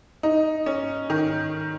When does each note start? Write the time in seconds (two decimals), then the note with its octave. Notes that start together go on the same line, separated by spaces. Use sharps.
0.23 D#4
0.66 C#4
1.10 D#3